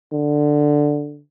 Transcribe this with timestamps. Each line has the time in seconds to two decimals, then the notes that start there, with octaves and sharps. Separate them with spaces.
0.13 D3